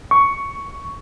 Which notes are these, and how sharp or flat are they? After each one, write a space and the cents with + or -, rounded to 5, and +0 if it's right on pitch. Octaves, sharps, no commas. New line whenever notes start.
C#6 +10